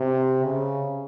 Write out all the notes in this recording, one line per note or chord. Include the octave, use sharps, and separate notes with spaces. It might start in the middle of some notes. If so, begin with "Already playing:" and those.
Already playing: C3
C#3